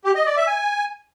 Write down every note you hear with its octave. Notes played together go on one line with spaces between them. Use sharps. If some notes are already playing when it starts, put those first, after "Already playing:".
G4
D#5
D5
E5
G#5